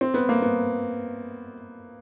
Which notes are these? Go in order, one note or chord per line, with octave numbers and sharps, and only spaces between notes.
C4
B3
A#3
B3